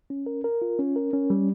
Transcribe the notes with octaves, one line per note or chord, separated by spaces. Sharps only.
C#4
A#4
A#4
F4
C#4
A#4
C#4
G3